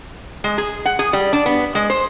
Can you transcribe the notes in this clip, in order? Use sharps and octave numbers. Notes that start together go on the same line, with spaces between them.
G#3
G#4
F#5
G#4
G3
D4
B3
G#3
C5